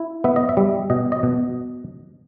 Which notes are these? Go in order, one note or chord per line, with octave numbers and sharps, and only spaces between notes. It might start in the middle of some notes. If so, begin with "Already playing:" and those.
Already playing: E4
B3 E5
D#5
E5
G3
B2 D#5
D#5
B2